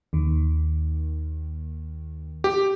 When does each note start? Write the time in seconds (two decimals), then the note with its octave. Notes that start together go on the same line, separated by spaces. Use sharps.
0.13 D#2 D#3
2.44 G4